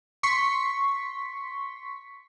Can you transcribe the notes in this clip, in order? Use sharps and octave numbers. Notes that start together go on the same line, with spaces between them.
C6 C#6 B6